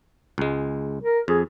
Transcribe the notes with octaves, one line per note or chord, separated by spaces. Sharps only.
C#2 G#3
A#4
F2 G#4